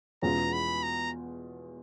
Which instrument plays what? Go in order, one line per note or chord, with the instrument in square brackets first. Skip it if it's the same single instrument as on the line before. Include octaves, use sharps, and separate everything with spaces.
[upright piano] E2 B2 G#3 C#4 F4 [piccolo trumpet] A#5
[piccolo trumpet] B5
A#5